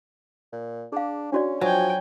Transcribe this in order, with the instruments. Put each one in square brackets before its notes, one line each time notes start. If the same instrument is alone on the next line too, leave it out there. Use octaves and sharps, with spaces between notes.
[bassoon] A#2
[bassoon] D4 [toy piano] G#4 F5
[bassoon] C#4 [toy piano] D4 F#4 D5
[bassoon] F3 [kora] F#3 [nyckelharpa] G5 G#5